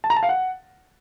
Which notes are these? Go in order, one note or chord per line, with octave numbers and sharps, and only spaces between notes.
A5
A#5
A5
F5
F#5